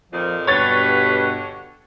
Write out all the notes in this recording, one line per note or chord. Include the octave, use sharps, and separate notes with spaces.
F2 A#2 D#3 F3
G2 B2 D3 G4 B4 C#5 F#5 A6